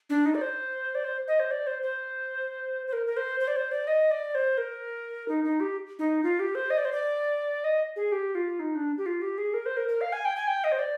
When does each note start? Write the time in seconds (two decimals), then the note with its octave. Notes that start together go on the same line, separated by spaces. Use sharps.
0.10 D4
0.26 D#4
0.35 D5
0.41 C5
0.95 D5
1.04 C5
1.28 D#5
1.40 C5
1.51 D5
1.67 C5
1.83 C5
2.87 C5
2.93 A#4
3.06 A#4
3.17 C5
3.40 C5
3.48 D5
3.56 C5
3.72 D5
3.87 D#5
4.11 D5
4.35 C5
4.58 A#4
5.28 D#4
5.44 D#4
5.60 G4
5.99 D#4
6.23 F4
6.39 G4
6.55 C5
6.70 D#5
6.77 D5
6.85 C5
6.92 D5
7.64 D#5
7.96 G#4
8.12 G4
8.35 F4
8.60 D#4
8.75 D4
8.98 G4
9.06 F4
9.22 G4
9.38 G#4
9.54 A#4
9.66 C5
9.77 A#4
9.88 A#4
10.01 F5
10.13 G#5
10.25 G5
10.36 G#5
10.47 G5
10.64 D#5
10.72 C5
10.79 D5